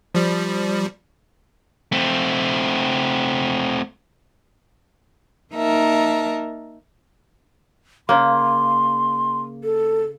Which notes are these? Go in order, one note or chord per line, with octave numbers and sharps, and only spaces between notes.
F3 G3
A3 C4
A#3 D#4 A#4 E5 A5 A#5
C#3 A#3 C6
A4